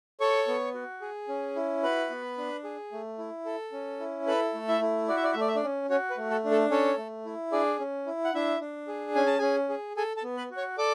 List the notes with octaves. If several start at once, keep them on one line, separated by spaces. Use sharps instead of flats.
A4 C#5 C#6
B3
F#4
G#4
C#4
E4
F#4 B4 B5
B3
D4
G#4
A3
E4
A4
C#4
E4
A4 B4 B5
A3
E4 E5
E4
F#4 D5
E5
D5
E5
A3
D5
E5
D4 D5
C#4
C#4 F#4 C#5
B4
A3
A4
D4
A4
C#4 A4 C#5
A3
E4
D4 G#4 D5
C#4
E4
F#5
D4 E4 E5
D4
G#4
C#4 G#5
A5
C#4 G#4 G#5
G#4
G#4 A4 G#5
A4 A5
B3
B4 B5
F#4
C#5 C#6
A4 D5 D6